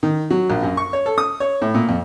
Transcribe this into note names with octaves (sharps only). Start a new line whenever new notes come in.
D#3
F#3
A#1
F#2
C#6
C#5
A4
D#6
C#5
A2
A#2
F2